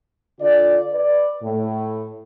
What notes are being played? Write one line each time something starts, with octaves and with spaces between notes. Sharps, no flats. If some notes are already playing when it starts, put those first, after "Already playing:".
D3 F4 D5
B4 D5
A2